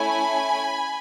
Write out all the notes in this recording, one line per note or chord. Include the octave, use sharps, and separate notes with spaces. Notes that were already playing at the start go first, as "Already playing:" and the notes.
Already playing: A3 C#4 E4 G#5 B5